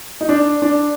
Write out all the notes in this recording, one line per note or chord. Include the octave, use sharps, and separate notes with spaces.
D#4
D4
D4